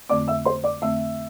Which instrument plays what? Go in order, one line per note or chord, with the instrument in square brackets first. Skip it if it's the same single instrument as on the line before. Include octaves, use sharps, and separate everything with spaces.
[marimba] F2 D3 A3 C4 [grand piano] D5 D6
[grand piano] E5 E6
C5 C6
D5 D6
[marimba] F2 D3 A3 C4 [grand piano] E5 E6